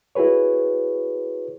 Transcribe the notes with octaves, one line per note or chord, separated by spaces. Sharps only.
E4 F#4 G#4 B4 C#5